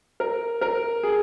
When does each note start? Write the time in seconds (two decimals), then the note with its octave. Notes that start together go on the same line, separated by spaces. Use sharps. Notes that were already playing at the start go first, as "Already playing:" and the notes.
0.20 A#4
0.61 A#4
1.03 G#4